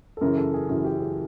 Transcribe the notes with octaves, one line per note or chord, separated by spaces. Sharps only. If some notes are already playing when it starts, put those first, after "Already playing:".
A4
F#2 C#3 E3 A#4
A4
G#4
F#2 C#3 E3 F#4
G4
G#4